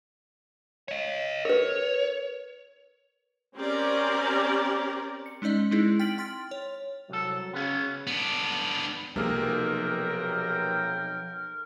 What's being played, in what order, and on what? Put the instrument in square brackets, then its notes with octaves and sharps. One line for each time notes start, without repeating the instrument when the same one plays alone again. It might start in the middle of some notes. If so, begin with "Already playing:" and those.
[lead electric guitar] C#5 D#5
[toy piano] A#4 B4 [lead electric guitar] C#5
[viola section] C4 C#4 G4 A#4 D5
[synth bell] C#7
G#3 C#4 D#4 D5 D#5
G#3 C4 D#4 E4 G#4
G5 F6 A6 B6 D7 F#7
G5 C6 F6 A6
C#5
[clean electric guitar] C2 A4 [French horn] F#3
[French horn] C#3 [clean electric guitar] B3 C#4
[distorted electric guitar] B3 D4
[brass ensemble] B1 G5 [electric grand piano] C3 A#3 G#4 [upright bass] F3 [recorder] A#4